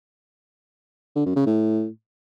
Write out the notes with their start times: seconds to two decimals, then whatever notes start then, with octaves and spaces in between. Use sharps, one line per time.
1.15 D3
1.26 F#2
1.36 C#3
1.46 A2